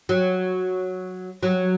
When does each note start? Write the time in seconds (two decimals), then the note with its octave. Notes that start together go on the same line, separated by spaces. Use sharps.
0.09 F#3
1.43 F#3